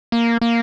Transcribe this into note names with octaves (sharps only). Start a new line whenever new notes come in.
A#3
A#3